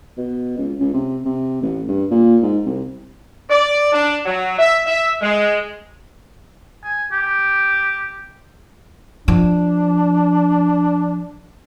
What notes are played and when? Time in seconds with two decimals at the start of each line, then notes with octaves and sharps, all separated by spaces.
0.18 B2
0.58 C#2
0.80 C#2
0.93 C3
1.25 C3
1.62 A1
1.88 G2
2.11 A#2
2.43 G#2
2.65 C2
3.49 D5
3.92 D4
4.24 F#3
4.57 E5
4.86 E5
5.20 G#3
6.84 G#5
7.12 G4
9.28 F3 D4